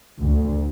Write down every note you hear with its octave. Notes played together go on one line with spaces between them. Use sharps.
D2